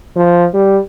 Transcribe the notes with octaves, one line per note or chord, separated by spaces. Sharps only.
F3
G3